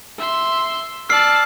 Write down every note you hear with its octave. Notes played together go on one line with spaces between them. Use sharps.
E5 C6
D5 A5 E6 F6 C7